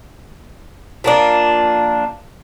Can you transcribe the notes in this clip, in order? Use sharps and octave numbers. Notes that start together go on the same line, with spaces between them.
F3 A#3 D4